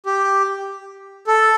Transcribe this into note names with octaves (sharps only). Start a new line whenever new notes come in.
G4
A4